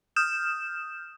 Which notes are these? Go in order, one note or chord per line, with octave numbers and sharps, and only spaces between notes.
D#6 F6 G6 E7